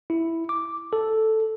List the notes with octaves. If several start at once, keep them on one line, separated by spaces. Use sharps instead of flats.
E4
D6
A4